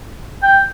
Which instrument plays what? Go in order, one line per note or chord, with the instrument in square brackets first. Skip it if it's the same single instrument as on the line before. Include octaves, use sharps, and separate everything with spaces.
[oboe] G5